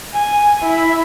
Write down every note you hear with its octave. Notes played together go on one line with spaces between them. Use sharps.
G#5
E4 B5